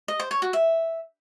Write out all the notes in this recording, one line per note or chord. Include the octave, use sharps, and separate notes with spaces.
D#5
C5
C#5
F#4
E5